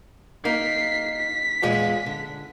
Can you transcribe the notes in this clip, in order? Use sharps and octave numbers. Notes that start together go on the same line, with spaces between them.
A#3 D#4 B6 C7
B6
E2 A#2 G#3
D3